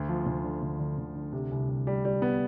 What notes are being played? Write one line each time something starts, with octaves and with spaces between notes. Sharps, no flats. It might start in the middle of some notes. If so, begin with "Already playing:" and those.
Already playing: D2
F3
D2
D3
D2
D3
D2
D3
C3
C2
C2
G3
G3
B3